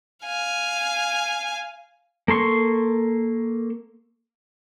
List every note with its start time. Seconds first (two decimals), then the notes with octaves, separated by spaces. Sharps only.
0.24 F5 G#5
2.28 A#3 A4 C6 C#6